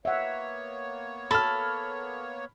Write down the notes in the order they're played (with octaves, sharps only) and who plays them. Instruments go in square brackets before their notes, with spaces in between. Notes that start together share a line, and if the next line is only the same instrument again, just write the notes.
[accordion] A#3 B3 C#5 [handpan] E5 F#5
[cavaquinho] A4 [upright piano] B5 F6